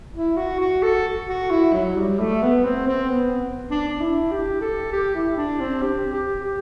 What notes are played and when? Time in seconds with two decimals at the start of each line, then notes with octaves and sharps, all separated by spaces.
0.14 E4
0.37 F#4
0.60 F#4
0.82 A4
1.28 F#4
1.51 E4
1.73 F#3
1.96 G3
2.19 A3
2.42 B3
2.64 C4
2.87 C4
3.10 B3
3.70 D4
3.88 D4
4.00 E4
4.31 G4
4.61 A4
4.92 G4
5.15 E4
5.37 D4
5.60 C4
5.82 G4
6.13 G4
6.43 G4